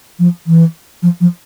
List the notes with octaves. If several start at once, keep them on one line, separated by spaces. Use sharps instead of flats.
F3
E3
F3
F3